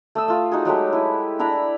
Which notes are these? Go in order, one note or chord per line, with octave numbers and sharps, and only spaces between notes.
A3 D#6 E6
A3 F4
D#4 F#4 G#4
F#3 G#3 A3 G4
E4 B4
D4 E4 A#5 B5